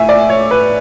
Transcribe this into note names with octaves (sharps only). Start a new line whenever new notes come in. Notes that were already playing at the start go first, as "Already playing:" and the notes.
Already playing: A2 E5 G#5
D5
C#5
B4